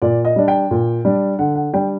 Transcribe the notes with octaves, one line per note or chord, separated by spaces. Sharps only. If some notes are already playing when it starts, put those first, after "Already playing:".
A#2 D5
D#5
G3 D4
G5
A#2
G3 D4
D3 F#5
F#5
G3 D4 G5